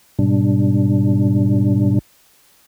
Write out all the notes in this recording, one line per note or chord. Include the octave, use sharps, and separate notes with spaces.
G#2 B2 G3 D4